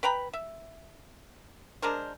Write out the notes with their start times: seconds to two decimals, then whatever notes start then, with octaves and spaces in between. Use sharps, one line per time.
0.03 B4 G5 A#5 B5
0.33 E5
1.82 G#3 D4 A#4 C5